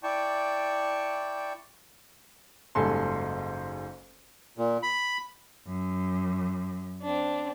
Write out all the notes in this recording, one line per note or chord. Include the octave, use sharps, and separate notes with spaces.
E4 D5 G5 A5 C#6
F#1 G#2 G3 A4 G#5 C6
A#2
B5
F#2
C4 D4